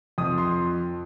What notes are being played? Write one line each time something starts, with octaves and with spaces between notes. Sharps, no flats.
F2 F3 D#6
C6